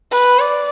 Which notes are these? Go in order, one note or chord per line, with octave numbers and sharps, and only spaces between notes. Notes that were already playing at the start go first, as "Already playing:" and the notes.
B4
D5